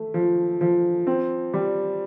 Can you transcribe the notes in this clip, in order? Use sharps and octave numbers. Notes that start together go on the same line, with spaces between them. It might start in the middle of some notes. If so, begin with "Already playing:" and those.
Already playing: A3
F3
F3
C4
G3